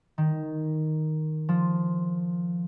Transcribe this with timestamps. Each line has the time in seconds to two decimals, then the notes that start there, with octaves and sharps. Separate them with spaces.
0.18 D#3
1.49 F3